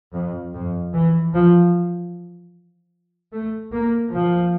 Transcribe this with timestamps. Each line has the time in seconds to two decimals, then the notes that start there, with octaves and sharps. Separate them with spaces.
0.13 F2
0.54 F2
0.93 E3
1.33 F3
3.32 A3
3.72 A#3
4.12 F3